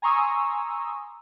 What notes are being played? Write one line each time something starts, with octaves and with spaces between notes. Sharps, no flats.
G#5 A#5 C6 C#6 D#6 E6